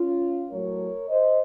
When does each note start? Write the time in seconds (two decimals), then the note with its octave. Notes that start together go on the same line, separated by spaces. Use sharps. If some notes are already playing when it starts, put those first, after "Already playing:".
Already playing: C#4 F4
0.49 A2 F#3 A3 A#4 C#5
1.08 C5 D#5